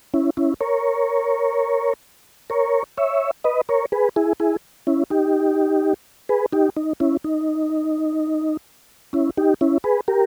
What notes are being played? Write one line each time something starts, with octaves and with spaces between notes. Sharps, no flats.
C#4 E4
C#4 E4
A#4 C#5
A#4 C#5
C#5 E5
B4 D#5
A#4 C#5
G#4 B4
E4 G#4
E4 G#4
C#4 E4
D#4 G4
G#4 B4
D#4 G4
D#4
C#4 E4
D#4
C#4 E4
D#4 G4
C#4 E4
G#4 B4
G4 A#4